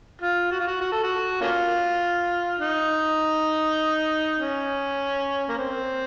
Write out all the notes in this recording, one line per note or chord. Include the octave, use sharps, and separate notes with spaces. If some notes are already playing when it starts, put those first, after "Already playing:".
F4
F#4
F4
F#4
F#4
A4
F#4
A#3 C#4 F4
D#4
C#4
A#3
C4